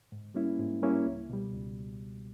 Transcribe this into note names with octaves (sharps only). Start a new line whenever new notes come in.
G#2
G3 A#3 C#4 E4
G#2
G3 A#3 C#4 E4
C#2
B2 G3
C#2